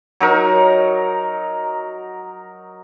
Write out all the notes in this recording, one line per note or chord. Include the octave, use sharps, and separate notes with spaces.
F#3 D#4 A#4